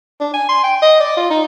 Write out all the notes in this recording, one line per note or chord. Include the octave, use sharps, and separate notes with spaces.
D4
G#5
C6
G5
D#5
D5
F4
D#4